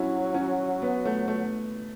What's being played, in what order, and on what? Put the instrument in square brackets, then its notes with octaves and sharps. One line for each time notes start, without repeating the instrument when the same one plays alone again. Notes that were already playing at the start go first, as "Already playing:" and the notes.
Already playing: [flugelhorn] F#3 [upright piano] C#4 E4
[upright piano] C#4
B3
A3
A3